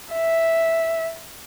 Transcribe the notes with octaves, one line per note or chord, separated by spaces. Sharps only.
E5